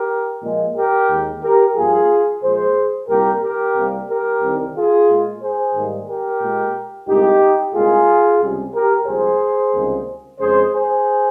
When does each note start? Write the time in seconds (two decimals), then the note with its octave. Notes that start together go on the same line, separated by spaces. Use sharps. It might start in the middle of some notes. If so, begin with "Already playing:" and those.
Already playing: G4 A#4
0.42 A#2 F3 G#3
0.76 G4 A#4
1.09 D#2 D#3 G#3
1.42 G4 A#4
1.76 G2 F3 A#3 F4 G#4
2.43 A#2 F3 G#3 G#4 C5
3.09 C2 A#2 G3 A#3 G4 A#4
3.42 G4 A#4
3.76 C2 C3 G3 A#3
4.09 G4 A#4
4.42 C2 C3 D#3 G3
4.75 F4 G#4
5.09 A#2 G#3
5.42 G#4 C5
5.75 G#2 D#3 G3 A#3
6.08 G4 A#4
6.41 A#2 G#3
7.08 C2 A#2 G#3 D#4 G4
7.74 C2 A#2 G#3 F4 G#4
8.40 C#2 C3 G3
8.73 G4 A#4
9.07 C2 A#2 F3 G#3 G#4 C5
9.74 C#2 C3 D#3 G3 A#3
10.40 F2 C#3 G#3 G#4 C5
10.74 G#4 C5